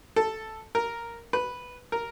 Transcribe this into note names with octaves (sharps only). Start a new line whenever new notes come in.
A4
A#4
B4
A#4